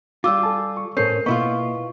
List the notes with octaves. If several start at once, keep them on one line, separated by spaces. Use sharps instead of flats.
G3 F4 D6 E6
A4 G#5 A5
C#6
A2 C#4 A4 A#4 C5 G6 C7
B2 A#3 B3 E4 F4 D#5 C#6